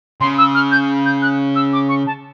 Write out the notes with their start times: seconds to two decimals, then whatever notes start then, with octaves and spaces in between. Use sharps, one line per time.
0.20 C#3 C6
0.38 E6
0.55 F6
0.71 G6
1.05 G6
1.22 F#6
1.55 E6
1.73 D6
1.89 C#6
2.06 A5